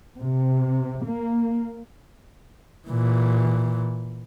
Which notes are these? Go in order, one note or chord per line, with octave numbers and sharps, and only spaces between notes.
C3
A#3
A#2 E3